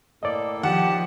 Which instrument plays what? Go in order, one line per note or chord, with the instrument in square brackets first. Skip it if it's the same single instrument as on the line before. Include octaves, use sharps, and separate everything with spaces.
[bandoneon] A2 A#3 A4 [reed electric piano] D5 D#5
[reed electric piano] D#3 [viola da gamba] F3 [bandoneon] G4 A5 [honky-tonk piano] F#5